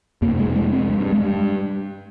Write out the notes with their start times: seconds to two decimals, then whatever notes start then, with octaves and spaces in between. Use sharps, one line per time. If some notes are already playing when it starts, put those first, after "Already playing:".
0.22 F2 A#3
0.25 C3
0.39 G#3
0.56 G#3
0.73 C4
0.90 G2 G#3
1.13 G#3